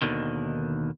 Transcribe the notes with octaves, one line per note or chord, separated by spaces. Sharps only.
D#2 B2 D3 D#3